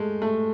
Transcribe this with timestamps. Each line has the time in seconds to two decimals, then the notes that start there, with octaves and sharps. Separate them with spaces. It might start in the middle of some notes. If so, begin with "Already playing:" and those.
Already playing: G#3 A3
0.22 A3